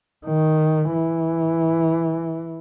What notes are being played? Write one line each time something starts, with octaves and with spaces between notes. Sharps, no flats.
D#3
E3